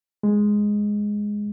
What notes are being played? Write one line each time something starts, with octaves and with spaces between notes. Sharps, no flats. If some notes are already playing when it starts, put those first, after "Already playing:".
G#3